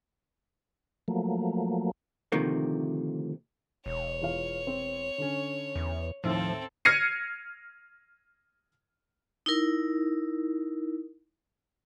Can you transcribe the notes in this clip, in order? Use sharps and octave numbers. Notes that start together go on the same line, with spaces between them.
F3 F#3 A3 A#3
D2 C3 D#3 F3 A3 A#3
E1 C#5
E2 F4 F5
C4
D3 C#4
E2
D#2 A2 F3 C4 A4 E6
F6 G#6 A#6 C7 C#7 D#7
D#4 E4 A#4